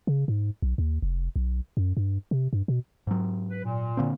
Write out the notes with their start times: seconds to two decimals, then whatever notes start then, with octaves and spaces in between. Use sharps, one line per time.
0.07 C#3
0.28 G#2
0.62 B1
0.78 D#2
1.02 F1
1.36 B1
1.77 F#2
1.97 G2
2.31 C3
2.53 G2
2.68 B2
3.07 G#2 F#3
3.49 B4
3.63 A#2
3.97 D3 A#3 C4